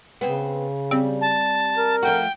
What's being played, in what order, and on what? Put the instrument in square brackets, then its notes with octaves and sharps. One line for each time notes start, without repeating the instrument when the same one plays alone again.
[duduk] C#3 [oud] B3 C4
[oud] G3 [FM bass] C4
[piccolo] A5
[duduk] A#4
[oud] F3 A3 F#4 [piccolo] G5